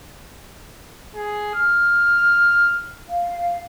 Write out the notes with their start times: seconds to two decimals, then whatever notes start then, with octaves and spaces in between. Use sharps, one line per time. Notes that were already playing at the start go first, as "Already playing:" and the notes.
1.15 G#4
1.54 F6
3.09 F5